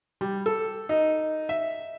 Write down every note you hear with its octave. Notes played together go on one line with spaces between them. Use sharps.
G3
A4
D#4
E5